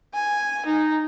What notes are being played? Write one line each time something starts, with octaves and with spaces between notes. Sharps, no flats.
G#5
D#4